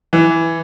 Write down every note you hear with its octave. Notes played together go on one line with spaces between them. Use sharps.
E3